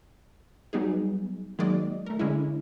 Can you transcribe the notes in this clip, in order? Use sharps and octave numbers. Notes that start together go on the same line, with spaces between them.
F#3 G3 B3 D#4 G#4
D#3 F#3 G#3 A#3 D5 D#5
A3 A#4
D3 G#3 C#4 D4 E4